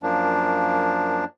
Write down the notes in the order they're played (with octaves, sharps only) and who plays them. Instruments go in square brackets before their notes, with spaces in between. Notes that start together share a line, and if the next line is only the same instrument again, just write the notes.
[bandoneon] F#2 F3 A#3 D4